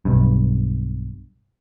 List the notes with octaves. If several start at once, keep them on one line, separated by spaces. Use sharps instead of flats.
B1 G2